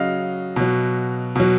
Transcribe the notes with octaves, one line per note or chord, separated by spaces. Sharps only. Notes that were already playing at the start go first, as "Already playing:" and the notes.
Already playing: C#3 F#3 D#5 F5
B2 F#3
B2 F#3